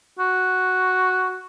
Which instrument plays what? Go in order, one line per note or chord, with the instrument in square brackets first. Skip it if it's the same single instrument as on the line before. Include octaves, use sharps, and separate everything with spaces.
[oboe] F#4